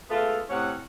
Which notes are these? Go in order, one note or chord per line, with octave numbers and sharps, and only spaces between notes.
G#3 A3 B3 F4 A4 E5
A2 C3 C#4 F#5